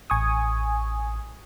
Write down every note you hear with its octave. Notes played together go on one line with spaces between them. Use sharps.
A1 G#5 C#6 D#6